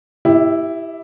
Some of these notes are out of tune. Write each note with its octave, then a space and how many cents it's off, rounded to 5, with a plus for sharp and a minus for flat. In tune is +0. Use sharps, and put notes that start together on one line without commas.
E4 +0 G4 +0 E5 -45